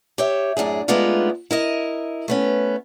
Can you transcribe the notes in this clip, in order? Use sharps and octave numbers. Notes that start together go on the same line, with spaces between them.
G4 C#5 E5
F#2 A2 D4 G#4
G#3 A3 B3 D4 D#4 F4
E4 A#4 D#5
A3 B3 C#4